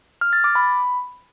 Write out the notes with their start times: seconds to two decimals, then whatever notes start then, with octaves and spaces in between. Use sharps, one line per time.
0.21 F6
0.33 A6
0.44 D6
0.55 B5